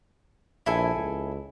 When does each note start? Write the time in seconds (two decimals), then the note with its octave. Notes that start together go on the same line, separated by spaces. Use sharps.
0.66 A#1 E4 A4 G#5
0.95 C#2